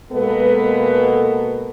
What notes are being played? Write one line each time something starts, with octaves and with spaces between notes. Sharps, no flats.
B2 G#3 A#3 B3 A4 B4